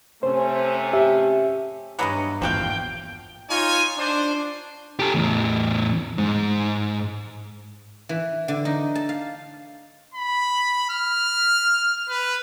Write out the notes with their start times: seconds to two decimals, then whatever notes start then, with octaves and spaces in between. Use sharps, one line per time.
0.23 C3 A3 C#4 C5
0.93 G4 E5
1.99 G2 E3 F#3 B3 D#5 F#5
2.42 G#1 E2 A#2 F3 F#4 F5 G5
3.50 D#4 F4 C#5 G#5
3.98 D4 C5
4.99 G4 A4
5.15 E2 A2
6.18 G#2
8.09 E3
8.48 D3
8.65 D#4
8.95 A5
9.09 F5
10.14 B5
10.90 F6
12.09 B4